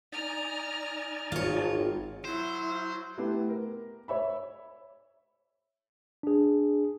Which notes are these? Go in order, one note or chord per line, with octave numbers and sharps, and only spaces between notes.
D#4 D5 G#5 A#5 F6
G#1 F4 C#5
F#3 E4 C5
A3 B3 E4 G4 B4
A#4
C#5 E5 B5
D4 G#4